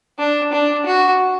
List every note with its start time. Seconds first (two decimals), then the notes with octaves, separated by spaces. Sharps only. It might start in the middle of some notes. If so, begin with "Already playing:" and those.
0.19 D4
0.52 D4
0.86 F#4